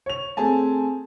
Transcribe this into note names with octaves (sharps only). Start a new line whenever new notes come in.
C#5 F7
A3 C4 G#4 G#5 A5